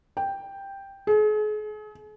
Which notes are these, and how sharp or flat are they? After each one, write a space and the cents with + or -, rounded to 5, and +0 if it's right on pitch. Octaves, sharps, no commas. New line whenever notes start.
G5 +5
G#4 +40